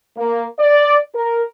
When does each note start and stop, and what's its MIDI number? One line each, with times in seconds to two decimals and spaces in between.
0.17 0.45 58
0.59 0.97 74
1.14 1.43 70